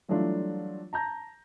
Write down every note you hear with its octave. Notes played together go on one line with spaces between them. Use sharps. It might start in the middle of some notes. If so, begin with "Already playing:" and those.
E3 F#3 G3 A3 D4 F4
A5 A#5 G6 A#6